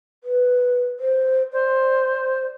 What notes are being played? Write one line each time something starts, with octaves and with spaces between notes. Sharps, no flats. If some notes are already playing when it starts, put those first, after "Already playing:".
B4
C5
C5 D5